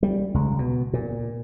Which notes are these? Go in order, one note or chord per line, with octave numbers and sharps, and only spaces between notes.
G3
C#2
B2
A#2